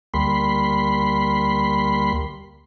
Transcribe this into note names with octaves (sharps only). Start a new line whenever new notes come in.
D2 G3 A#3 B5 C6